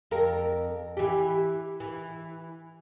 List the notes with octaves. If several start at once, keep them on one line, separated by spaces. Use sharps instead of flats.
F2 A#4
E3 G4
E3